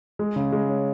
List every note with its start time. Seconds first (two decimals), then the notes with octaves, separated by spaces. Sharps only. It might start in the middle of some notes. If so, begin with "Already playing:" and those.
0.19 G#3
0.36 C#3
0.52 G#3
0.69 C#4